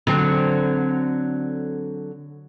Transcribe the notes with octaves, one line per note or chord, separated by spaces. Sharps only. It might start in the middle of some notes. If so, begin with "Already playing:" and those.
D3 F#3 C4